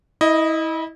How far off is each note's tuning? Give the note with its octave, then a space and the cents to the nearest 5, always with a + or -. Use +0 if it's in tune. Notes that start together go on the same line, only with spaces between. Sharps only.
E4 -30 D#5 +0